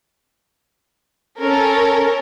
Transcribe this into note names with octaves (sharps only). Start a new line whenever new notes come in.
C#4 A4 A#4